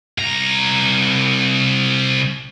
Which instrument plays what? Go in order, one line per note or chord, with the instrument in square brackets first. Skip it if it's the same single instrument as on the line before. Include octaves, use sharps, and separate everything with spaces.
[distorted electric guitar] C2 A#5